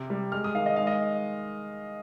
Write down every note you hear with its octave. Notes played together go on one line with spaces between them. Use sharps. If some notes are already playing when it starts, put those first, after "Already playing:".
Already playing: C3
G3
G#3 F6
D#6
D#3 F5
D#5
G#3 F5
D#5